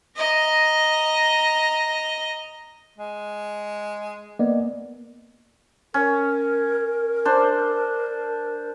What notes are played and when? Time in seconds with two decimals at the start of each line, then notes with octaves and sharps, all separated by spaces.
0.16 D#5 A#5
2.98 G#3
4.39 A#3 B3 D5 D#5
5.94 C#4 A#4
7.25 D4 C5